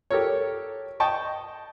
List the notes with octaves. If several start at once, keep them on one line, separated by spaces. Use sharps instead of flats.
G4 A4 A#4 C#5
D#5 G5 A5 C#6